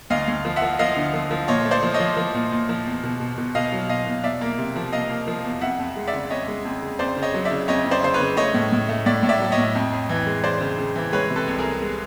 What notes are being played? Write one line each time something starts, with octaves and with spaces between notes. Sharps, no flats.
D2 D#5 F5
D2
F3
E5 F#5
F3
F3 D#5 F5
D3
F3
F3
A#2 C#5 D#5
C#5
A3
C5 D5
F3
C#5 D#5
F3
F3
A#2
A#2
F3
E2
B2
B2
B2
B2 D#5 F5
F#3
B2 D#5 F5
B2
E2 D5 E5
A#3
C3
F3
A#3 D#5 F5
A#3
F3
E2
F2 E5 F#5
F2
G#3
D5 E5
C#3
F2 C#5 D#5
G#3
F2
C#3
F2 C5 D5
C#3
C#5 D#5
F#3
D5 E5
C#3
F2 C#5 D#5
F2
C5 D5
C#3 C5
B4 C#5
C#3
A3 C#5 D#5
A2
A2
A3
A2 D5 E5
A2
D5 E5
F#3
C#5 D#5
A2
F2
F2
E3
G#3
G#3 C5 D5
C#3
C#3
E3
G#3 B4 C#5
C3
A4 B4
C2
G#4 A#4
C3
G#3